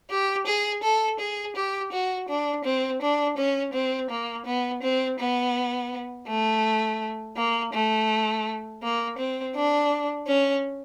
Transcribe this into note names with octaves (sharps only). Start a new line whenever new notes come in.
G4
G#4
A4
G#4
G4
F#4
D4
C4
D4
C#4
C4
A#3
B3
C4
B3
A3
A#3
A3
A#3
C4
D4
C#4